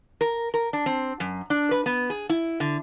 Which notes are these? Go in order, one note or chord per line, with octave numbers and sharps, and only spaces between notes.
A#4
A#4
D4
C4
F#2
D4
B4
B3
G#4
E4
D3